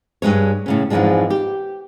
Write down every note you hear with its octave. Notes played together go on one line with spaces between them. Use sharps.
G2 B2 G#3 C#5
A2 C#3 C#4
F2 G#2 E3 F3 G#3 D4
G4